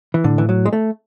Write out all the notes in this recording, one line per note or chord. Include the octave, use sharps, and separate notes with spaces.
E3
A2 D3
E3
F#3
G#3
A3